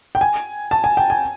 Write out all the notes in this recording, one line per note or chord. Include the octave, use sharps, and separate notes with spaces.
G5
G#5
A5
G#5
G5
G#5